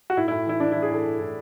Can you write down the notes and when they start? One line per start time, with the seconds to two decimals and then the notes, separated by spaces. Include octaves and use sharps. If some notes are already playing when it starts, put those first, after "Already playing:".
0.10 F#4
0.17 A2 E4
0.28 E4
0.31 A2
0.45 E3 E4
0.60 E3 D4
0.72 E4
0.75 E3
0.82 G#4
0.89 A2 A4
1.05 A2
1.20 A2